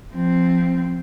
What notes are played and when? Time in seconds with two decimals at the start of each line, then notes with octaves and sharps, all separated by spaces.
0.14 F3 C4